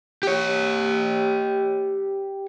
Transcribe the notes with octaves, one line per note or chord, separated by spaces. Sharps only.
G4 C#5